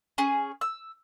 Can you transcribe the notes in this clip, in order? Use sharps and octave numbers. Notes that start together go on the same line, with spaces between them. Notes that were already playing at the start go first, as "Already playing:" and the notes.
C#4 G#4
E6